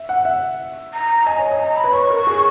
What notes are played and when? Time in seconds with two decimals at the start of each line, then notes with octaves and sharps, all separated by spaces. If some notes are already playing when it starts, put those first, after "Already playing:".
Already playing: E5
0.09 F#5
0.25 E5
0.93 A#5
1.26 D#5 G#5
1.39 C#5
1.52 D#5
1.59 A#5
1.76 B5
1.84 B4
1.93 C#5 C#6
2.10 A#4
2.27 G#4